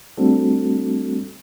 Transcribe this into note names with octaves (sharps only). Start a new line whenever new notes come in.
G3 A3 C4 D4 F#4 A4